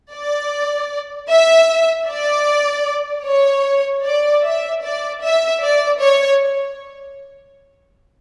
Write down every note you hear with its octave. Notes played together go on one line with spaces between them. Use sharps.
D5
E5
D5
C#5
D5
E5
D5
E5
D5
C#5